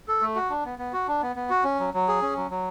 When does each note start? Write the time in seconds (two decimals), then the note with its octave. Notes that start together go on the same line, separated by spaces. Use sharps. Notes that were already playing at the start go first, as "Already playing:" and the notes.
0.08 A4
0.21 A3
0.36 F#4
0.50 D4
0.65 B3
0.79 B3
0.93 F#4
1.08 D4
1.22 B3
1.36 B3
1.50 F#4
1.64 C#4
1.80 F#3
1.94 F#3
2.08 G#4
2.22 C#4
2.37 F#3
2.51 F#3